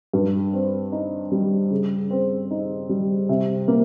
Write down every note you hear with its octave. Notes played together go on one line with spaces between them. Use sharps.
G2
C4
D#4
G3
C#3
C4
D#4
G3
C3
A#3